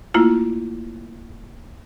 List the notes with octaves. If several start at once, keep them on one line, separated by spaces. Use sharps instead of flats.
A3 A#3 E4 F4